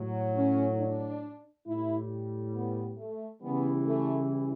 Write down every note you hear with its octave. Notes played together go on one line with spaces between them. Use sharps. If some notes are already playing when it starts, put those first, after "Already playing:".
Already playing: A2 F#3
C#4
D4
A2 G3 E4
B3
A3
C#3 E3 G3 B3
A3